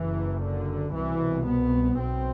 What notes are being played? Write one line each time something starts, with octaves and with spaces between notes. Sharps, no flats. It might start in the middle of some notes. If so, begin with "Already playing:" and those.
Already playing: F#1 F#2 E3
D3
C2 B2 E3
B3
B1 B2 C4